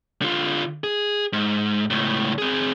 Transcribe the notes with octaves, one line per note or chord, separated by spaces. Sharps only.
D3 F4
G#4
G#2
C#2 A2
C4 G#4